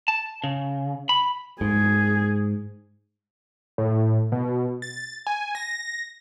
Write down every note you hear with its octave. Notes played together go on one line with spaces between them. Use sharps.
A5
C#3
B5
G#2 G#4
A2
B2
A6
G#5
A#6